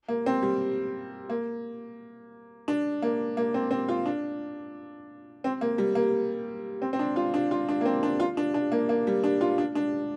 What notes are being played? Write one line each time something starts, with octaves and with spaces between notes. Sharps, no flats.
A#3
C4
G3
A#3
D4
A#3
A#3
C4
C4
F4
D4
C4
A#3
G3
A#3
C4
C4
D4
F4
D4
F4
D4
A#3
C4
D4
F4
D4
D4
A#3
A#3
G3
D4
F4
D4
D4